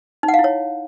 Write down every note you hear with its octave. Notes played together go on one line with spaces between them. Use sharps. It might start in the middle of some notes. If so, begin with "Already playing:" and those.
D#4
F#5
F5
E4
C#5